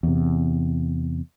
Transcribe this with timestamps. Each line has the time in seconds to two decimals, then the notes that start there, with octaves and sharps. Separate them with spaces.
0.03 E2 C3